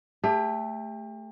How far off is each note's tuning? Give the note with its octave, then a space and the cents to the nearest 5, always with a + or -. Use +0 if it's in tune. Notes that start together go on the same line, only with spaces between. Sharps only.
A3 +0 G4 +35